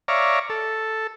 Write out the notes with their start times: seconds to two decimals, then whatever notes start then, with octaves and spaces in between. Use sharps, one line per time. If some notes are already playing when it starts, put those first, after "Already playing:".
0.08 C#5 D5 E5 F5 A#5
0.50 A4